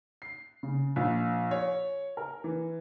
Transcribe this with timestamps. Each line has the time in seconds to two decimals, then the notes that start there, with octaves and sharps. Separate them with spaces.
0.22 C7
0.63 C#3
0.96 A#1
1.51 C#5
2.17 A#4
2.44 E3